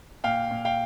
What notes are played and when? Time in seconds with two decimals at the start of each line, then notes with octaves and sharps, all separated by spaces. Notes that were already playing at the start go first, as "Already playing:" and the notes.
0.24 A#2 F5 G5
0.51 A#2
0.65 F5 G5